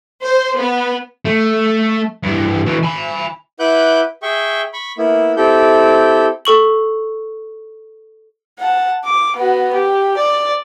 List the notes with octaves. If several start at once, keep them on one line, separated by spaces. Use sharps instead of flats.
C5
B3
A3
G2 E3
B2 E3
G#5 B5
E4 B4 F#5 D6 F#6 G6
G#4 E5 G5 C#6
B5 C#6
A#3 B3 E4
C4 E4 G4 A4 G6
A4 C#6 F#7
F#5 A5
D6
B3 F#4
G4
D5